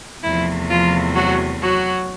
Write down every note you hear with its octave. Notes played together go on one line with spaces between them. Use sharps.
E2 C3 F3 A3 E4
F3 F4
F#3 F#4
F#3 F#4